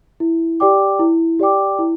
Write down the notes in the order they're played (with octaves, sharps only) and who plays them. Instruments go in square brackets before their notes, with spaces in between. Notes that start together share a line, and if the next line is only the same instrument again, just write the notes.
[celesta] E4
G4 D5 G5 D6
E4
G4 D5 G5 D6
E4